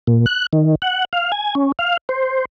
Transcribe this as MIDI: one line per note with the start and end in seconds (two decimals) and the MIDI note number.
0.07 0.26 46
0.26 0.46 90
0.53 0.75 51
0.82 1.05 78
1.13 1.32 77
1.32 1.55 80
1.55 1.72 61
1.79 1.97 77
2.09 2.45 72